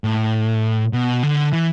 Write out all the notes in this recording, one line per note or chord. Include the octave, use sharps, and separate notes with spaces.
A2
B2
D3
E3